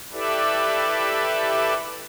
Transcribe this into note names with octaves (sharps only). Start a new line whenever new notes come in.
E4 G4 A4 B4 D5 E5